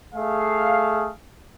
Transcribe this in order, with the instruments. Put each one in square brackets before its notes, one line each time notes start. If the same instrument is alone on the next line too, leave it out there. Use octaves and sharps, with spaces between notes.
[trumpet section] A3 G#4 F5